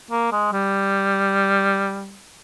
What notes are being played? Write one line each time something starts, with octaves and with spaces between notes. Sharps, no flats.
A#3
G#3
G3